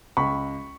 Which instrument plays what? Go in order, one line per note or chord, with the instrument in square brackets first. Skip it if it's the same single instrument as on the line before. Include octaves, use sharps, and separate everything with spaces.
[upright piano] C#2 B5 C#6